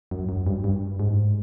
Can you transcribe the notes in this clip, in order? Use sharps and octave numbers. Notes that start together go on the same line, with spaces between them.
F#2
F#2
G2
G2
G#2